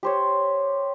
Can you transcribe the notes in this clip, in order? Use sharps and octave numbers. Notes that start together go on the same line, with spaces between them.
G4 C5 C#5